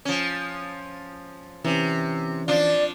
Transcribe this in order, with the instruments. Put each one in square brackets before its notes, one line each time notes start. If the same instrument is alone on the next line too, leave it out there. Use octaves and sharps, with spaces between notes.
[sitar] F3 C#4
[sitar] C3 [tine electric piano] E3 C#4
[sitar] F3 D4 F4 [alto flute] D5